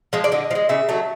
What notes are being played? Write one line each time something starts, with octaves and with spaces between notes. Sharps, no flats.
F3 G#3
D5
D3 D#5
F3
G#3
C#3 E5
F#3 A3